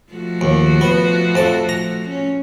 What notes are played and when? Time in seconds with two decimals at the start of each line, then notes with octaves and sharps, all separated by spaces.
0.12 F3 A3 F#4
0.41 D#2
0.81 B3
1.35 F2 A5
1.69 A#5
2.08 C#4